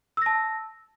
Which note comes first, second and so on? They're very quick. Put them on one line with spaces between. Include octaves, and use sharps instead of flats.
E6 A#6 A5